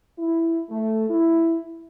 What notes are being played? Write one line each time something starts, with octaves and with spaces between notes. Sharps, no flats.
E4
A3
E4